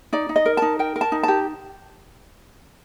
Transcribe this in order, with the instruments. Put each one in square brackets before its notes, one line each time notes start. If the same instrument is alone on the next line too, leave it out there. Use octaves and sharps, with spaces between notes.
[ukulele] D#4 D5
D#4
D#5
A#4
D#4 A5
A#4 G5
A#4
A5
D#4
G4 A5